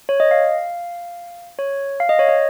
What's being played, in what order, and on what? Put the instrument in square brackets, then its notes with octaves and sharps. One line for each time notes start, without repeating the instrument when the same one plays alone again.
[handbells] C#5
D#5
F5
C#5
F5
D#5
C#5
D#5